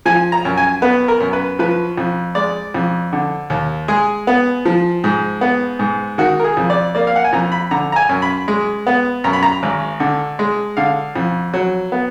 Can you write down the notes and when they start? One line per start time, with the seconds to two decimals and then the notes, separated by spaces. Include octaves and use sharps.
0.05 F3 G#5
0.32 A#5
0.45 F#2
0.57 G#5
0.82 B3 B4
1.08 A#4
1.20 F#2
1.33 B4
1.59 F3 B4
1.98 F2
2.35 G#3 D5
2.74 F2
3.13 D3
3.50 D#2
3.88 G#3 G#4
4.27 B3
4.65 F3
5.04 G#2
5.41 B3
5.79 G#2
6.18 D#3 F#4
6.40 A#4
6.44 G#4
6.57 F2
6.70 D5
6.95 A#3 D5
7.07 F5
7.16 F#5
7.24 G#5
7.33 F2 A#5
7.52 B5
7.71 D3 A#5
7.92 A#5
7.96 G#5
8.09 F#2
8.22 B5
8.48 G#3
8.87 B3
9.24 F#2 A#5
9.33 B5
9.43 A#5
9.63 G#1
10.00 D3
10.39 G#3
10.77 D3 F5
11.16 F2
11.54 F#3
11.92 B3